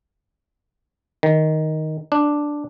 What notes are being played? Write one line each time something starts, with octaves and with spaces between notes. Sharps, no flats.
D#3
D4